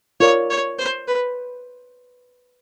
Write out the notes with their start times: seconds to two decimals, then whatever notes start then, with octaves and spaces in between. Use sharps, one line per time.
0.20 F4 A#4 C#5 D5
0.50 C#5
0.78 C5
1.08 B4